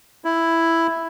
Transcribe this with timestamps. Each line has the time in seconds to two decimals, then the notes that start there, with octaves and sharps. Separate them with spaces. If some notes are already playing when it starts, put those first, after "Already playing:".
0.25 E4